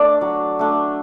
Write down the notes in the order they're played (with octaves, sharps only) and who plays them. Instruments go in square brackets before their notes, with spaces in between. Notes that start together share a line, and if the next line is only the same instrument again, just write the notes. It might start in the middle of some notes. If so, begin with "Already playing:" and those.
Already playing: [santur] A3 D4 D5
F#3
A3 D4